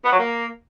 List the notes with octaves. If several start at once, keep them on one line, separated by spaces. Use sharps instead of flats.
B3
F#3
A#3